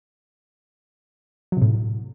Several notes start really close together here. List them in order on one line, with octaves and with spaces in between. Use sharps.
F#3 C3 A2